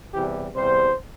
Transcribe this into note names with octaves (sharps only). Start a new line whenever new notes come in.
E2 C3 E3 G3 G4
E2 C3 G3 C5